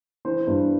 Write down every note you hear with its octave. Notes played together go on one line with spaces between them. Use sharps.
E3 C5
G2